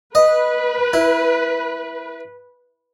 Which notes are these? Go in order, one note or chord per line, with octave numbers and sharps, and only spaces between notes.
B4 D#5
E4